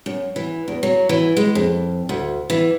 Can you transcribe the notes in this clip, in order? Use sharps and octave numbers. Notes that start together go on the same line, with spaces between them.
F#2
E3
E2
F#3
E3
G#3
F2
D2
E3